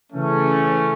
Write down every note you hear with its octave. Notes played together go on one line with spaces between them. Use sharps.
C#3 E3 A3 C#4